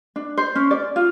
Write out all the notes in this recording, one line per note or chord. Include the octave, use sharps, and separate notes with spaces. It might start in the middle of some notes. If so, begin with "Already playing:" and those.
D4
C5
C#4
D5
F4